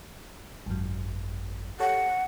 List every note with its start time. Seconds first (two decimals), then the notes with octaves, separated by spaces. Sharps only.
0.66 G#1 F#2
1.80 G4 A4 C#5 F#5